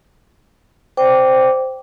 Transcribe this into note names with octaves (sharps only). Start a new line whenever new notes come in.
C5 D5 G5 D6